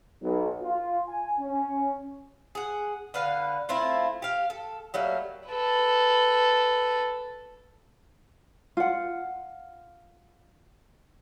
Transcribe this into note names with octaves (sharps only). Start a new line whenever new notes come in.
B1
F4
G#5
C#4
G#4 F#5
D3 B4 F5
A3 C4 E4 F4
G4 F5
A4
F#3 G3 A3 A#3
A4 B4
F4 F#5